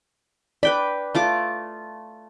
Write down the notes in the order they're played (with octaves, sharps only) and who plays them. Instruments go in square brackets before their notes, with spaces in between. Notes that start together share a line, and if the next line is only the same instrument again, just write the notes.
[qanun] B4 G5 B5 [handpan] D5
[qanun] A3 F4 D6